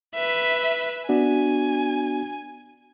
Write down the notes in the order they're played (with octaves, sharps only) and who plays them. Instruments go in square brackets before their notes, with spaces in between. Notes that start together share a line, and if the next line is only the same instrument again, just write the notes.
[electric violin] B4 E5
[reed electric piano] B3 D4 F#4 [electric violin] G#5